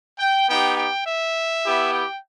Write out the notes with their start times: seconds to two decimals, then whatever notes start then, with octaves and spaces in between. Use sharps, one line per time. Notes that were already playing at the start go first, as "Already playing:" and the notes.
0.19 G5
0.49 B3 D#4 G4 G5
0.77 G5
1.05 E5
1.64 B3 E4 G4
1.93 G5